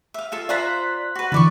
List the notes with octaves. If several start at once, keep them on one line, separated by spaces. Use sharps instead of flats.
E5 F5
F4 A4 E5
F4 C5 D5 A#5 F#6 B6
F#4 B4
D3 E3 A4 D5 C#6